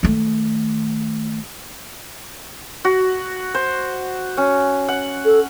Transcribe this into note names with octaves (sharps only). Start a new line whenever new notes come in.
D#3 A3
F#4
C5
C#4
F#5
A4